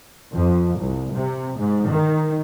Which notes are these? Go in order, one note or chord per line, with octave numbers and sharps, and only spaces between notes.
F2
C2
C3
G#2
D#3